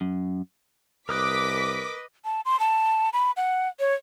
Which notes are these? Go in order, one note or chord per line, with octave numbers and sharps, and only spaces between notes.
F#2
C2 A#4 B4 D#5 D6 D#6 F#6 B6
A5
C6
A5
B5
F#5
C#5